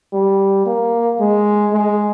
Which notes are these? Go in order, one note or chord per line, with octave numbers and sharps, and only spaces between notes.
G3
A#3
G#3
G#3